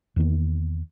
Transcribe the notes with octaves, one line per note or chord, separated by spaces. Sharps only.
E2 D#3 A#3 B3